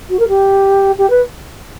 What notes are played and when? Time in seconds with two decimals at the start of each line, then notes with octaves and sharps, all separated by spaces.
0.09 F#4
0.19 A#4
0.28 G4
0.98 G4
1.10 B4